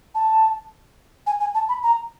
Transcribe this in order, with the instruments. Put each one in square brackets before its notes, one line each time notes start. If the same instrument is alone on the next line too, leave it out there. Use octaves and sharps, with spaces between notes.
[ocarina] A5
G#5
G#5
A5
B5
A#5